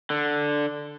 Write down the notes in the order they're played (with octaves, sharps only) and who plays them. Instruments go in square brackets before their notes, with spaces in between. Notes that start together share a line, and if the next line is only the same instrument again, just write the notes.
[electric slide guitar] D3